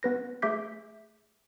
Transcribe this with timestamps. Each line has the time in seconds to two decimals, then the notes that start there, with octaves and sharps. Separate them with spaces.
0.03 B3 B4 A#6
0.42 A3 G#4 E5 D6 G6 B6